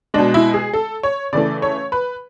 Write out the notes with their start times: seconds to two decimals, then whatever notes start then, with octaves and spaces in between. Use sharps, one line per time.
0.14 B2 G#3 D4
0.34 E4
0.54 G#4
0.73 A4
1.03 C#5
1.33 C#3 E3 A3 D5
1.62 C#5
1.92 B4